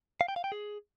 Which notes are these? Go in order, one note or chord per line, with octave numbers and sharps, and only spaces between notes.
F5
G5
F5
G5
G#4